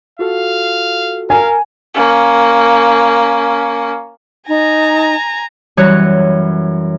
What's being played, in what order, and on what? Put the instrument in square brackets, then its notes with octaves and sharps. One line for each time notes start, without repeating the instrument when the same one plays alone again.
[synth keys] F4 F#4 A4 [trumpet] F5
[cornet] A#4 [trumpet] F5 [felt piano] G#5
[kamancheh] A#3 C#4
[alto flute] D#4 [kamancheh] G#5 A#5
[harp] F#2 E3 G3 C#5 F#6